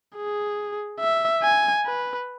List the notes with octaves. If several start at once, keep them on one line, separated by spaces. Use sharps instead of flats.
G#4
E5
G#5
B4